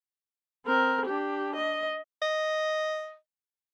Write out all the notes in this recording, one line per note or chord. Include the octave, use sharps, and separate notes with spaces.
C4 A#4
D4 G4
D#5
D#5